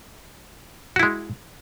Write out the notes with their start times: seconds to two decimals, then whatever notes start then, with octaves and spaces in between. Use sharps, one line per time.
0.96 F#4
0.99 E4
1.03 G#3